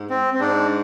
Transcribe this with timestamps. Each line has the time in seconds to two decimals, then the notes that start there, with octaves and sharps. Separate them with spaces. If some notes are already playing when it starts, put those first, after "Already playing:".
Already playing: G#2
0.10 C4
0.34 C4
0.40 G#2 D4